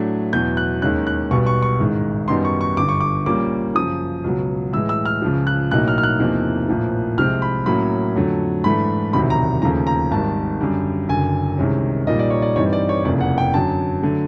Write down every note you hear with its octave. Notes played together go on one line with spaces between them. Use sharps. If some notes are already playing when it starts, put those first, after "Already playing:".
Already playing: A2 F#3 A3 D4
E2 B2 F#3 G6
F#6
D#2 D#3 G#3 C#4 F#6
F#6
B1 B2 G3 B3 C#6
C#6
C#6
A1 G#2 D#3 G#3
F#2 D#3 G3 B3 D#4 C6
C#6
C#6
G1 G2 D3 D6
C#6
D6
A#1 A#2 G3 A#3 C#4 D6
F#2 C#3 F3 D#6
C#2 B2 F#3
A2 E3 G#3 E6
E6
F6
C#2 C#3 F3
F#6
B1 A2 F#3 A#3 D#4 F#6
F6
F6
F#6
E2 C3 F3 A#3 D#4
A#1 A2 F3 A#3
C2 C3 F3 G#3 C4 F6
B5
A2 F#3 A#3 C#4 B5
F2 D3 F#3 A3
G#2 E3 A3 D4 B5
E1 D2 C3 D#3 F#3 B5
A#5
D#2 C#3 F3 A3 A#5
A#5
G#1 G#2 D#3 G3 A5
F#2 D3 G3
F#1 F#2 D3 G#5
C2 C3 D#3 G#3 C#4
A#1 A#2 G3 A#3 D#4 D#5
D5
C#5
D5
G2 E3 G3 C4 D#4 C#5
D5
C#5
F1 E2 C#3 F3 A#3 D5
F#5
G5
F#2 D3 F#3 A5
D3 F#3 A3